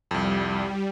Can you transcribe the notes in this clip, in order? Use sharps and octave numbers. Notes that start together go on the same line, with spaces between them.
C2 F2 G3